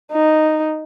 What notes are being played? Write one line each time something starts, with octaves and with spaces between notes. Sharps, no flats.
D#4